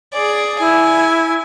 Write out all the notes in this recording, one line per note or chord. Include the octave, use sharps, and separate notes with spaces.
G#4 D5
E4 G#5